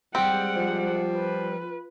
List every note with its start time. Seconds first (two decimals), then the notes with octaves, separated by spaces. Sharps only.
0.15 G3 G#3 C4 G4 F#5
0.56 F3
1.16 F4 B4